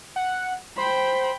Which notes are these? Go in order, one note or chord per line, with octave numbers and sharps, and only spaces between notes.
F#5
C5 G5 B5